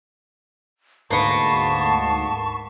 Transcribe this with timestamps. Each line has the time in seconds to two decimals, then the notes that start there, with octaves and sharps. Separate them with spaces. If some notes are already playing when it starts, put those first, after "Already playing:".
1.10 D2 G#2 A#3 B3 A5 C#6 C7